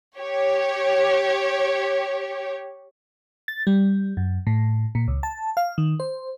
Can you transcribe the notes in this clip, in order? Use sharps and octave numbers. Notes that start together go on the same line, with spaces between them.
G4 C#5
A6
G3
F#2
A2
A#2
C#2
A5
F5
D#3
C5